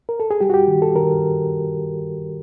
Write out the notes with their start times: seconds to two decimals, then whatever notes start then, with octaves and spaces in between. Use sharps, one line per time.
0.09 A#4
0.20 A4
0.31 G#4
0.41 G3 G4
0.50 F#4
0.54 G4
0.68 D#3
0.82 A4
0.95 D#3 A#4